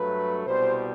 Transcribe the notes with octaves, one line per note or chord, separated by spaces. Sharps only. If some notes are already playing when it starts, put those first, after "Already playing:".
Already playing: G2 F#3 A3 B4
C2 B2 G3 C5